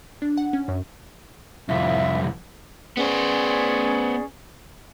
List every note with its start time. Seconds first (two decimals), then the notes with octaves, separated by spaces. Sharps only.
0.22 D4
0.37 F#5
0.53 C#4
0.68 F#2
1.69 C2 F2 E5
2.97 B3 C#4 G#4 C5 D5